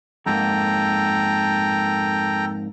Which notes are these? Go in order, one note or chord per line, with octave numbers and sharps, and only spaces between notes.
F2 G#2 A#3 A4 G5 A#5